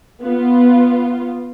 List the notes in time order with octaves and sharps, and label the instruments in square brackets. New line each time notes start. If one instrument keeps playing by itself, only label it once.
[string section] B3 F4